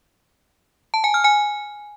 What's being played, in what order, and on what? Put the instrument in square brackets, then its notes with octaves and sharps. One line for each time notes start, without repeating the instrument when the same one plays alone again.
[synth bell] A5
G#5
F6
G#5